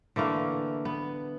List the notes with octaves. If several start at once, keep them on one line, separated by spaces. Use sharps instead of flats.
D3 E3 A3 A#3
B3